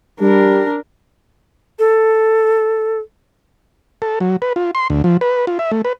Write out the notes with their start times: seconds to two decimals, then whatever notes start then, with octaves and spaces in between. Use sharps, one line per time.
0.20 G3 D4 A#4
1.79 A4
4.02 A4
4.20 F#3
4.42 B4
4.56 F4
4.75 C6
4.90 D2
5.04 F3
5.21 B4
5.47 F4
5.59 E5
5.72 A3
5.85 B4